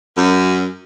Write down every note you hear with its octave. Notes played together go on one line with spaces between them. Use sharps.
F#2